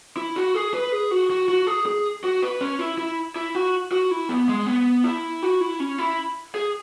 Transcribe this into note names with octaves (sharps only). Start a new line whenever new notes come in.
E4
F#4
G#4
B4
G#4
F#4
F#4
F#4
G#4
G#4
F#4
B4
C#4
E4
E4
E4
F#4
F#4
E4
B3
G#3
B3
E4
F#4
E4
C#4
E4
G#4